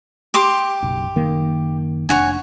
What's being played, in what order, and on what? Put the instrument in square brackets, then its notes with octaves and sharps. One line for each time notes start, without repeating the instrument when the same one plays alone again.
[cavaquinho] G4 C6 D6
[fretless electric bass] F#1 B1
F#1 D#3 A#3
[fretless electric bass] F1 D4 [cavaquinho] C#5 F#5 G#5